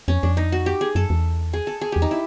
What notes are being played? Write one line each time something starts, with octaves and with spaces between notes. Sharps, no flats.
F2 C#4
F2 D4
D#4
F#4
G4
G#4
F#2 A4
E2
G#4
A4
G#4
E2 G4
D#4
E4